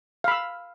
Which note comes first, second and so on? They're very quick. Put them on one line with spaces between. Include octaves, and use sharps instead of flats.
F5 B5 E6